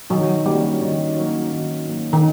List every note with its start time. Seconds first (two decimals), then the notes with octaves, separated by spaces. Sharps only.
0.10 D#3 F#3
0.45 F#3 G3 A#3 C#4
0.81 D#3
1.16 F#3 A#3 C#4
1.52 D#3
1.87 F#3 A#3 C#4
2.13 D#3